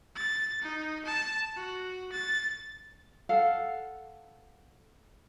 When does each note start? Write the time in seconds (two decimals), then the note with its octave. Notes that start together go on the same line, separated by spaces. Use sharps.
0.16 A6
0.62 D#4
1.05 A5
1.56 F#4
2.12 A6
3.29 A4 F5 F#5